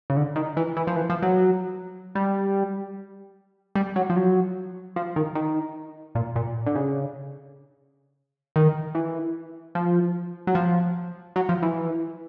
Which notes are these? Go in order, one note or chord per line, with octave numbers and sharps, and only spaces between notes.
C#3
D3
D#3
E3
E3
F3
E3
F3
F#3
G3
G3
F#3
F3
F#3
F3
D#3
D#3
A#2
A#2
D3
C#3
D#3
E3
F3
F#3
F3
F#3
F3
E3